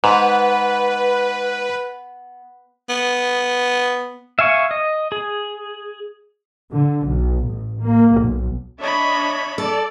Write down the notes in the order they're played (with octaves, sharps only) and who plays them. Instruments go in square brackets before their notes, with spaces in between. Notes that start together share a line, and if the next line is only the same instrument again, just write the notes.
[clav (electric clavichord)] G#2 [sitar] B3 [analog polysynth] B4
[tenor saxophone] B3
[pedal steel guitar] E5 F5 G#5 C#6
D#5
G#4
[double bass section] D3
B1
A1
A#3
B1
[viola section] D4 C#5 D#5 [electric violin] E5 B5
[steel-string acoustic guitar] A4 [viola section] D5